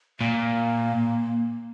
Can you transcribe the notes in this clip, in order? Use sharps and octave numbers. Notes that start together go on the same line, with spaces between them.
A#2 A#3